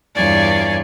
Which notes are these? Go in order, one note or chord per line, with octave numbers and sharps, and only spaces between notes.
E2 G2 F4 C#5 D5 G#5